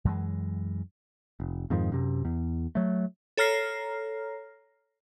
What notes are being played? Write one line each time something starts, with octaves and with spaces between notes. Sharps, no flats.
F#2 E3 G#3
F1
F2 G#2 D#3 F3
F#2 C3
E2
F#3 A3
A4 C#5 A#5 F6 A#6 C7